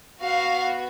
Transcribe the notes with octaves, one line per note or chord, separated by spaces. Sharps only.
B3 F#4 F5